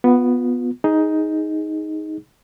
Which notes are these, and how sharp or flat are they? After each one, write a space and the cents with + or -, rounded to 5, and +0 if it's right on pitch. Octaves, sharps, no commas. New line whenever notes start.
B3 +0 F4 +30
D#4 +10 G#4 +0